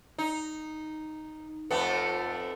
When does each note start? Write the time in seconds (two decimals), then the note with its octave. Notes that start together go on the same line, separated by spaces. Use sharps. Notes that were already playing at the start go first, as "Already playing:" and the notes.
0.18 D#4
1.71 F2 A3 B3